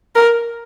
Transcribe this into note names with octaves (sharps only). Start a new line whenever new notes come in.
A#4